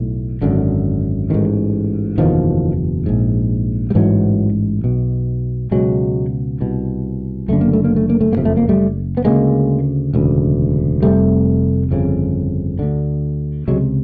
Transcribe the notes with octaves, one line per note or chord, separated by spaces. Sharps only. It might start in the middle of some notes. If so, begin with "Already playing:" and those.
Already playing: B1 A2
G#1 F#2 D3
A1 G#2 D#3
F#1 E2 B2 D#3 F3
A#1 G#2
G3
A1 G#2 E3 F#3
B1 B2
C#2 B2 F#3 G#3
C2 B2
F#1 F#2 D3 A3
A#3
A3
A#3
A3
A#3
A3
A#3
F#1 F2 C3
A3
A#3
G3 A3
B3
D2 C#3 G#3 A#3
E1 D2 C#3
F1 F2 C3 G3 A3
G1 F2 C#3
D2 D3
C#2 C3 F#3 G#3